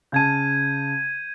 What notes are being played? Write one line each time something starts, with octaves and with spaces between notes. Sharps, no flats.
C#3 A5 G6 G#6 D#7